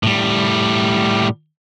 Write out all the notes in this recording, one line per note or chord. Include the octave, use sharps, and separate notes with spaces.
A2 G3